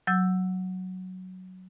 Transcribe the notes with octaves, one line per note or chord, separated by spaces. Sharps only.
F#3 E6 G6